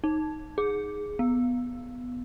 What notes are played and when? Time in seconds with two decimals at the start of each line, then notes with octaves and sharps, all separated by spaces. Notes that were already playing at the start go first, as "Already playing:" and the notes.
0.04 D#4
0.58 G#4
1.19 B3